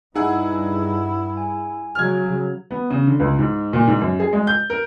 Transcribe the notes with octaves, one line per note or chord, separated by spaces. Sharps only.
G2 D#4 E4 G#4 F#5
G#5
C#3 F#3 F6 G#6
B3
C#3
D3
C#2
G#2
A#2
G#2
F#2
G#4
G#3
G6
A#4